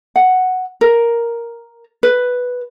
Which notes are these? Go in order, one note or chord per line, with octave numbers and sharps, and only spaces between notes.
F#5
A#4
B4